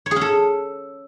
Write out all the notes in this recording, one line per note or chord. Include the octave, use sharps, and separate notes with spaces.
C#5
G#4
C#4
A4